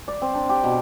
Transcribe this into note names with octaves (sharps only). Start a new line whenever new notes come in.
D5
C4
D4
G4
B2